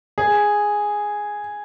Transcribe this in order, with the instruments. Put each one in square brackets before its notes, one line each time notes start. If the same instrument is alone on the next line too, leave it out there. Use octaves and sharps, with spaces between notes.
[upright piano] G#4